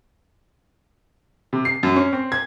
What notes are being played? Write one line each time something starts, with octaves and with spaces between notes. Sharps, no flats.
C3
C7
F#2
C#4
C4
G#6